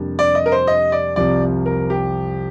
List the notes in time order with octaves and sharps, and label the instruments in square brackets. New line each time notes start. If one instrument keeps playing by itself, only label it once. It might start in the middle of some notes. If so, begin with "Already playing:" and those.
Already playing: [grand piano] F2 C3 G3 A#3 D4
[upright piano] D5
D#5
A#4
C5
D#5
D5
[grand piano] C2 C3 F3 [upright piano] D5
[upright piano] A#4
G4